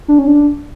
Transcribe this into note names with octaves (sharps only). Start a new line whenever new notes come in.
D4
C#4
D4